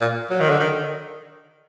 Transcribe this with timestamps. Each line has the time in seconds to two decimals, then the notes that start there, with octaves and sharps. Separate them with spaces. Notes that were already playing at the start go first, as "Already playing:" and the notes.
0.01 A#2
0.30 F#3
0.40 D#3
0.50 D3
0.60 D#3